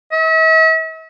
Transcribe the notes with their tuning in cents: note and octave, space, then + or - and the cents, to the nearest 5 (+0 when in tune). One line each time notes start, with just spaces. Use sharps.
E5 -45